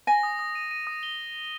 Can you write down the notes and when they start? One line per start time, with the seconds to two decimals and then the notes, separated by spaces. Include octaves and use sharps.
0.07 G#5 A#6
0.23 D#6
0.39 D#6
0.55 D#7
0.71 D#7
0.87 D#6
1.03 G7